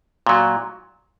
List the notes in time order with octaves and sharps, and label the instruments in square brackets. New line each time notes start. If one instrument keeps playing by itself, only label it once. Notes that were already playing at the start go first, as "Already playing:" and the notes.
[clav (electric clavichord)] A#2 F#3